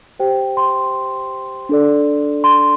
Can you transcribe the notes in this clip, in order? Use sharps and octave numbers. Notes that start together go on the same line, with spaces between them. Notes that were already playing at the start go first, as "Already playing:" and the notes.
G4 C5 G5
C6
D4 A4 D5
C6